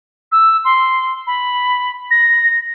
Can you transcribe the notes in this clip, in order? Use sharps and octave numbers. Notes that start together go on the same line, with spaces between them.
E6
C6
B5
A#6